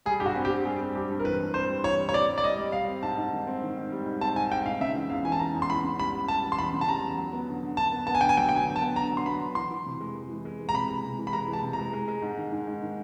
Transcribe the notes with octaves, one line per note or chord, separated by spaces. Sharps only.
G3 G#4
G2 G4
F#4
C4
G4
C4
G3 G#4
C4
G2 G4
G2
A#4
E3 B4
G2
C4 C5
G3
E3 C#5
G3
C#5
C4 D5
G3
D5
G3 D#5
G3
G3 F5
C4
G#2 A5
G#2
D#3
C4
D#3
D#3
G3
G#2
C4 A5
G#2 G#5
G#2 G5
G#2 F5
C#3 E5
E3
E2 F5
E3 G#5
A5
E3 A#5
E2
C6
E2 B5
C#3
G3 B5
G3
G3 A5
E3
C6
E2 B5
C#3
A5
G3 A#5
E2
F#3
B3
D3
D3
D3 A5
B3
B3 A5
G#5
D3 G5
G#5
F#3 G5
D3 G5
G#5
D3
A5
B3
D3 A#5
F#3
C6
B3 B5
D3
E3 C6
E3
C3
G#3
G#3
E3
G#3
E3
A#5
C3 B5
G#3
C3
E3
B5
G#3 A#5
E3
A5
C3
A#5
G#3
G#3
G#3
G#2
D#3
G#2
G#2
D#3